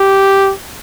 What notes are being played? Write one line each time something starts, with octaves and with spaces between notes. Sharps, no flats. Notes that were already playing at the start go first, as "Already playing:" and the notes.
Already playing: G4